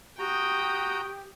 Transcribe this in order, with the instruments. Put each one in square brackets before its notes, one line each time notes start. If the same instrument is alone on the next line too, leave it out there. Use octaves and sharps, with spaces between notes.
[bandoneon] F#4 A#5 [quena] G4 [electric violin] G5 D#6